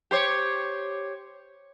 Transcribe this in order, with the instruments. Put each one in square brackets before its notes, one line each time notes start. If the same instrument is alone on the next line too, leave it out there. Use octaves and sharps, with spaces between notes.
[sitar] G4 C5 C#5